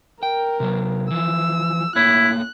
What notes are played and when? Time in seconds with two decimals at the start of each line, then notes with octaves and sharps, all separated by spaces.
0.23 A#4 G5
0.60 C3 F#3
1.11 E3 F3 E6
1.96 A3 A#3 E4 C#5 F#6